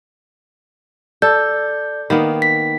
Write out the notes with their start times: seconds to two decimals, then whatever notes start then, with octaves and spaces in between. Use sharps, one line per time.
1.22 A4 D5 G6
2.10 D#3 A#3 B3
2.42 B6